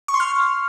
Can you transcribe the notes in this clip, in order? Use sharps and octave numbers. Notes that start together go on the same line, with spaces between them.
C#6
C6
F6